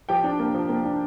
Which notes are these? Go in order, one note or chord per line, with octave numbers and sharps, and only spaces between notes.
F3 G4 G5
D4
A#3
F3
A#3
D4